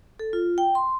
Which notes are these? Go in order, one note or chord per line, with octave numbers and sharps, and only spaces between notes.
A4
F4
G5
C6